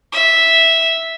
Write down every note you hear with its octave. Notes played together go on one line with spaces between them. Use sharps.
E5